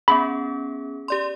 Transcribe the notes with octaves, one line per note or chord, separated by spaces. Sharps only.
B3 C#4 G#4 B5
G4 D5 C6